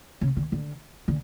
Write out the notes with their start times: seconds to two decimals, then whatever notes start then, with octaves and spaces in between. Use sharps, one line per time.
0.21 C#3
0.36 D3
0.52 D3
1.08 D3